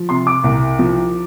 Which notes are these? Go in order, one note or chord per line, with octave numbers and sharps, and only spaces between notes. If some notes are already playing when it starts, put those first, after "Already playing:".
Already playing: F3
C3 C6
D6
C2
F3